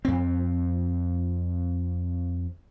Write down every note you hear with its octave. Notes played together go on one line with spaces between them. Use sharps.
F2 C4